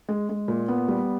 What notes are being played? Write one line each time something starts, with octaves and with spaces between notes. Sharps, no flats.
G#3
G#3
A#2
B3
G3